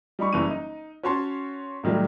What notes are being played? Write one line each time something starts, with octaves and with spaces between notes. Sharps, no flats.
G3 D#4 B5 C#6
F#1 E3 G3 C#6 D#7
D#4
C#4 F#4 C#5 A5 C6
A2 D#3 F#3 G3 A3